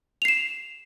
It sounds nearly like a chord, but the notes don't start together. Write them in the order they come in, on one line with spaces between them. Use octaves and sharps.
F7 C7 E7